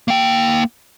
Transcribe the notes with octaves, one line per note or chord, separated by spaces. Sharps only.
A#3 G5